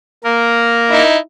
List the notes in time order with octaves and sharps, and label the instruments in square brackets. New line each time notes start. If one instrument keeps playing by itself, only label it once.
[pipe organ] A#3 A#4
[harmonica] D#4 E4